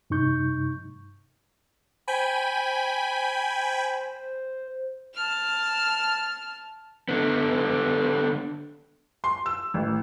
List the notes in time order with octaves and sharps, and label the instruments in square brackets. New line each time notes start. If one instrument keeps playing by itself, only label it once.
[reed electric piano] G2 C3 D#4 C#6 G6
[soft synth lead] C5 [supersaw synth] G5 G#5 B5
[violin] A5 F6
[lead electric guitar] D3 B3
[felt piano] C6
E6
A1